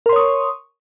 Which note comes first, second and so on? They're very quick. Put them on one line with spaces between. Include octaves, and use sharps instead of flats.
A#4 C6 C#5 D#6 C#6